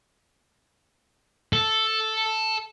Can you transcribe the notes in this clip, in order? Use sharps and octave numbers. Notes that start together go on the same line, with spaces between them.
A4